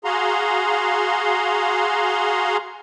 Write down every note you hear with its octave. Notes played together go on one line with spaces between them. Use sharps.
F#4 G#4 F5 A#5 C6